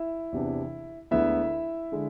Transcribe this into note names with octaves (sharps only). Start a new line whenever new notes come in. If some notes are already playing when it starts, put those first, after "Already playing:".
Already playing: E4 E5
E2 C3 E3 B3 D4
D2 D3 G#3 B3 E4 E5
D3 G#3